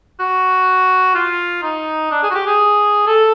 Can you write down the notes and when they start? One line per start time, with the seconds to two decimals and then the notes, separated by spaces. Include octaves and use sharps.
0.20 F#4
1.15 F4
1.63 D#4
2.11 D4
2.23 G#4
2.30 F#4
2.35 G4
2.47 G#4
3.07 A4